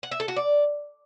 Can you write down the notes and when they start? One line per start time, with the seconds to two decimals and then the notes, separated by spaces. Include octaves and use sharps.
0.03 F#5
0.11 E5
0.20 A4
0.28 F#4
0.36 D5